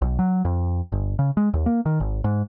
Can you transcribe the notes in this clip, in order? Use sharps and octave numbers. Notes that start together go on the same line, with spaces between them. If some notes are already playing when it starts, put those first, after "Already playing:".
B1
F#3
F2
G1
C#3
G#3
D#2
A#3
D#3
G#1
G#2